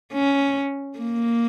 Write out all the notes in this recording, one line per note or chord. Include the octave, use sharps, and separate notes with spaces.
C#4
A#3